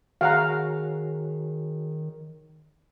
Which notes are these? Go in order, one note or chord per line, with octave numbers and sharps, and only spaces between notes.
D#3 F#4 G#4 C#5 F5 F#5 A#5